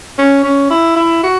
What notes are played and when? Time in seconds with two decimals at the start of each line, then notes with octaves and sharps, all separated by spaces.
0.18 C#4
0.44 C#4
0.70 E4
0.96 E4
1.23 F#4